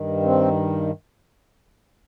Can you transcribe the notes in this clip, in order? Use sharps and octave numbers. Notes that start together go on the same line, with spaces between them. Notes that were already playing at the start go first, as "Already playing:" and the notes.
Already playing: G2 D#3
C4